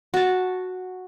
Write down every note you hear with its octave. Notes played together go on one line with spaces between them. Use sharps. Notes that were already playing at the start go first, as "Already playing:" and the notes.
F#4 A5